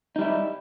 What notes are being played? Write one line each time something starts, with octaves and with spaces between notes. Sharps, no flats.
G3 D#4 E4